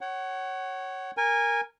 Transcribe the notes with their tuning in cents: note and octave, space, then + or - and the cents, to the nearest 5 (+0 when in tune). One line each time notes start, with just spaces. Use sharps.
C#5 -10 F#5 +25
A#4 +0 G#5 -20